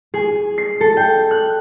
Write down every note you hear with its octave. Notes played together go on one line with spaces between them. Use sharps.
G#4
C7
A4
G5
F#6